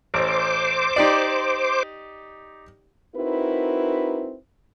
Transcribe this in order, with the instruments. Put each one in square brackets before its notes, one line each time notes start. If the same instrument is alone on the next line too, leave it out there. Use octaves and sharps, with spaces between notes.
[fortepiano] A1 [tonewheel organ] C5 D6
[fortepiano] D#4 G4 D5
[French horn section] C4 D#4 E4 F#4 A#4 B4